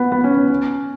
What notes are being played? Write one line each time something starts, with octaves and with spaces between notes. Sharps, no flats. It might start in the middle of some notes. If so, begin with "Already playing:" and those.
Already playing: B3
B3
C#4
C#4
C#4